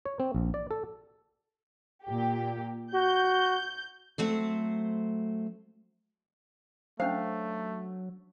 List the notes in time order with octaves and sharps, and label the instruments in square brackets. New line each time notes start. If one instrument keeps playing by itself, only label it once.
[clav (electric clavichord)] C#5
C4
A#1
D5
A4
[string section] A#2 G4
[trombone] F#4 [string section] G6
[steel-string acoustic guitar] F#3 A3 C4 C5
[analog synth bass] F#3 [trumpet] A3 [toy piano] C#4 D4 C5 [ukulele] F5